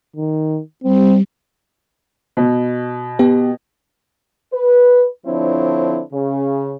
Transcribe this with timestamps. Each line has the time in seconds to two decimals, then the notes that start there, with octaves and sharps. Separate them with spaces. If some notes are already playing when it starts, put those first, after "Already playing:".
0.16 D#3
0.83 G3 C4
2.37 B2
3.19 B3 G4
4.53 B4
5.26 D3 F3 C4 D4 E4 C#5
6.13 C#3